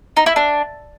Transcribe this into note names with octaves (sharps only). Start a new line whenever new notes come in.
D#4
E4
D4